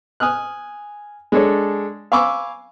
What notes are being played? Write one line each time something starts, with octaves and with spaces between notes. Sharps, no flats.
G#5 D#6 F6 F#6
G#3 D4 A4 C#5
F5 G#5 B5 C#6 D6 E6